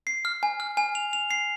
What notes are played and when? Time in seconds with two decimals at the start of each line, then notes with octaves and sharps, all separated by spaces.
0.07 C7
0.25 F6
0.43 G#5
0.60 F6
0.77 G#5
0.95 F7
1.13 F7
1.31 C7